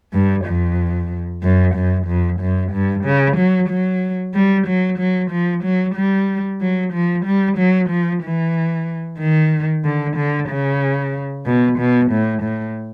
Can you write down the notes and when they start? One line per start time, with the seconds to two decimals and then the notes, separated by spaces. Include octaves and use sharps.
0.13 G2
0.46 F2
1.43 F#2
1.75 F#2
2.07 F2
2.41 F#2
2.73 G2
3.05 C#3
3.37 F#3
3.69 F#3
4.35 G3
4.67 F#3
4.99 F#3
5.31 F3
5.64 F#3
5.95 G3
6.61 F#3
6.93 F3
7.26 G3
7.58 F#3
7.90 F3
8.23 E3
9.19 D#3
9.84 D3
10.17 D3
10.49 C#3
11.46 B2
11.79 B2
12.11 A2
12.43 A2